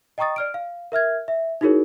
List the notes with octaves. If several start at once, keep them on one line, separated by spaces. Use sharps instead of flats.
D#5 G5 A#5 C#6 D#6 A6
D5 F6 D7
F5
A#4 E5 F6 G#6
E5
D#4 E4 F#4 G#4 A#4 C#5